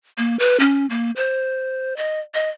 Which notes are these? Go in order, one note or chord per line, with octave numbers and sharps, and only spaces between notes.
A#3
B4
C#4
A#3
C5
D#5
D#5